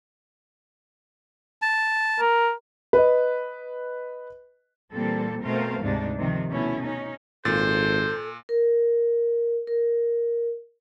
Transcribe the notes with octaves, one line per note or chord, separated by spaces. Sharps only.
A5
A#4
B4 D#5
A#2 E3 G3 A#3 C4 A4
B2 A3 C4 A#4 C5 F5
D2 G#2 C3 D4 D#4
C3 D#3 F3
B2 A3 C#4 E4
C#4 D#4
G#1 A#2 A4 C5 A6
A#4
A#4